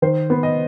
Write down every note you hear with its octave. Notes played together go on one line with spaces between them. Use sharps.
D#3 C5
B3
D#5